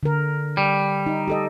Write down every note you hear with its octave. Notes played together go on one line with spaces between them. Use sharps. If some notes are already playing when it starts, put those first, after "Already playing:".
D3 A#4
G3
D#4
G4 A4 D#5